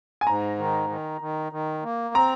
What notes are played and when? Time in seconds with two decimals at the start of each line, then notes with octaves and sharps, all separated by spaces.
0.21 G#5
0.26 G#2 A#5
0.58 D#3
0.90 D#3
1.21 D#3
1.52 D#3
1.83 A#3
2.15 C4 A#5